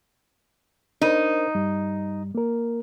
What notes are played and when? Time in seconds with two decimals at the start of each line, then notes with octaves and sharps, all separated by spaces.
1.01 D4 D#4 A#4 C5
1.55 G2 G3
2.35 A#3 A#4